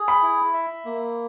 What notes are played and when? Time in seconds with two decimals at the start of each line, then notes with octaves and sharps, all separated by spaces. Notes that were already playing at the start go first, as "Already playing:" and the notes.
Already playing: G#4
0.08 B5
0.22 E4
0.54 E5
0.85 A#3